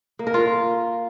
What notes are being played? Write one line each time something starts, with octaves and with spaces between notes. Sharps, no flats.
A#3
A#4
F4